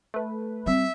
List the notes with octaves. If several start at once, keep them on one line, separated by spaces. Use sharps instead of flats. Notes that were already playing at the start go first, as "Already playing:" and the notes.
A3 B4
G3 C4 E5